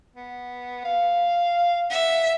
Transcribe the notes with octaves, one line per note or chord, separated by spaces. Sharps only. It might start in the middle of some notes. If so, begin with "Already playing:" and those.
B3
F5
E5 F#5